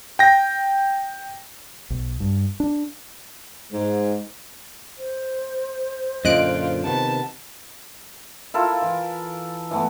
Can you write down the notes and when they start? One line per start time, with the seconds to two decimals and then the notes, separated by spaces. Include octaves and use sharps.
0.19 G5 A#6
1.90 B1
2.20 G2
2.60 D4
3.72 G#2
4.98 C5
6.25 F#2 A#2 D3 F4 D#5 F#6 D7
6.84 C3 D#3 B3 A5
8.54 E4 F4 A4 A#4
8.82 E3
9.71 E3 A3 B3